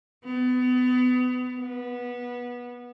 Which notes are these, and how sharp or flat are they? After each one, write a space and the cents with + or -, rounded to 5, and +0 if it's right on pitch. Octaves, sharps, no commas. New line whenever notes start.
B3 +30
B3 -20